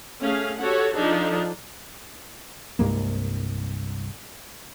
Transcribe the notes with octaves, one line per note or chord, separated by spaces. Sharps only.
A3 C#4 G#4 F5
F#4 G4 A4 C#5 F#5
F3 D4 D#4 G#4 A4
C2 G2 G#3 A#3